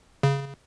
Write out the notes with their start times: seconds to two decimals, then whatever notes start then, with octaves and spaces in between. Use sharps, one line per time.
0.23 C#3